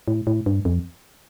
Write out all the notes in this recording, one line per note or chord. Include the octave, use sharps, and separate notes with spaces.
A2
A2
G2
F2